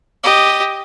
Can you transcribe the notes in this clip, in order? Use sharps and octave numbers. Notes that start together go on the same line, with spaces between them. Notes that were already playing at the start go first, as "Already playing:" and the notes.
G4 D#5